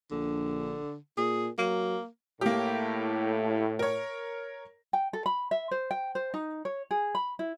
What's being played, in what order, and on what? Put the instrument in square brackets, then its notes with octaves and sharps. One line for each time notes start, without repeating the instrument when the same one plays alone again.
[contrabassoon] A#1 [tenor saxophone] D3
[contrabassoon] A#2 [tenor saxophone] G#4
[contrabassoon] F#3 [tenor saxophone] A#3
[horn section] A2 [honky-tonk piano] A#3 G4
[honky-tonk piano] A#4 C#5
[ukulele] G5
A4
B5
E5
C5
G5
C5
D#4
C#5
G#4
B5
E4